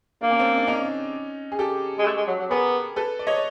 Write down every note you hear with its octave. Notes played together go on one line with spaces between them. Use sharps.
A#3 D4
C#4
C4 D4
D4
C#4 D#4
G#4
G4 A4
G#3
A3
G#3
F#3
F#3
B3 G#4 A#4
A4 B4
D5
C#5 D#5